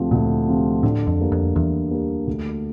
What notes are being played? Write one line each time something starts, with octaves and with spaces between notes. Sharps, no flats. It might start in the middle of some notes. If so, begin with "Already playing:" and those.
Already playing: D2 C3 F3 C4 F4
D2 A#2
C3 F3 C4 F4
A2 D3
F2
G3 A#3
F2
E2 D3
G3 A#3
D2